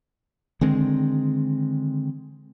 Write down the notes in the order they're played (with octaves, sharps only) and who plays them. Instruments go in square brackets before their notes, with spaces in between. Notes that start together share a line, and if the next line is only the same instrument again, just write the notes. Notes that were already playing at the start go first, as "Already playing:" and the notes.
[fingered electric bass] D3 D#3 G#3 C4